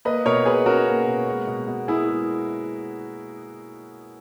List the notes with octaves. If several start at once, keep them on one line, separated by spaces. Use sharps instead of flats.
A#3 B4 D#5
B2 A#4 C#5
B2 G#4 B4
C#4 F#4 A#4
A#3
B2
G#3
B2
B2
B3 E4 G#4
G#3